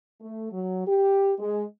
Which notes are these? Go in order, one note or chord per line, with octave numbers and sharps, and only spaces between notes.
A3
F#3
G4
G#3